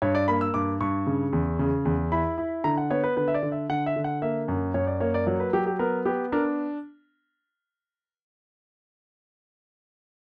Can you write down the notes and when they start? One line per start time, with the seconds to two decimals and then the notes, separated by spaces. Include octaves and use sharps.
0.02 G2 C#5
0.15 D5
0.28 A#3 B5
0.41 E6
0.54 G2 D6
0.80 G2 C#6
1.07 C#3
1.33 E2
1.59 C#3
1.85 E2
2.12 E4 B5
2.38 E4
2.64 D3 A#5
2.77 F#5
2.90 B3 C#5
3.04 B4
3.17 D3 B4
3.28 E5
3.34 D5
3.43 D3
3.52 E5
3.69 D3 F#5
3.86 E5
3.96 D3
4.04 F#5
4.22 A#3 E5
4.48 F#2
4.74 F#2 C#5
4.87 D5
5.00 A#3 C#5
5.14 D5
5.27 F#3 C#5
5.40 B4
5.53 F#3 G4
5.66 G4
5.79 B3 A#4
6.05 B3 G4
6.32 D4 A#4